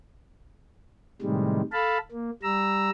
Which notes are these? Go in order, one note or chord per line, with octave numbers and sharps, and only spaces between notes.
A2 C3 D#3 G3 G#3
A4 F5 A5 B5
A#3
G3 A#5 E6